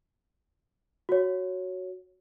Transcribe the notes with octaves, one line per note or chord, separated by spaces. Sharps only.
F#4 C#5